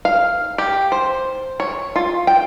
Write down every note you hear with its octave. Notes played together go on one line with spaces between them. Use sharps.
F5
G4
C5
C#5
F4
G5